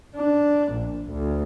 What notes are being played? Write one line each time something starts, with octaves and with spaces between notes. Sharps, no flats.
D4
A#1
D2